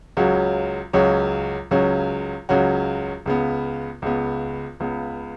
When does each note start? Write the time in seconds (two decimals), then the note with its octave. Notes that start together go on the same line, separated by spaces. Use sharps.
0.17 C#2 C#3 F#3 C#4 F#4
0.93 C#2 C#3 F#3 C#4 F#4
1.71 C#2 C#3 F#3 C#4 F#4
2.49 C#2 C#3 F#3 C#4 F#4
3.26 C#2 C#3 B3
4.02 C#2 C#3 B3
4.80 C#2 C#3 B3